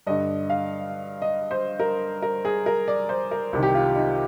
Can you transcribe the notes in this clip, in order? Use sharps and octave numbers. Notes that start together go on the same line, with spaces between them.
G2 D3 D#5
F5
D#5
C5
A#4
A#4
G#4
A#4
D5
C5
A#4
C2 C3 D#3
G4
F4
D#4